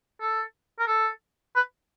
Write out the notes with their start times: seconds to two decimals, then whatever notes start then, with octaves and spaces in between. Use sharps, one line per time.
0.21 A4
0.79 A#4
0.87 A4
1.55 B4